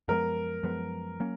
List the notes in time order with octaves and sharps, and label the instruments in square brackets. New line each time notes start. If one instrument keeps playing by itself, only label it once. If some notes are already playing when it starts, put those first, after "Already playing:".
[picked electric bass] F#2 F3 G#3 B3 [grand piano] A#4
[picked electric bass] F#2 F3 G#3 B3
F#3 A#3 C#4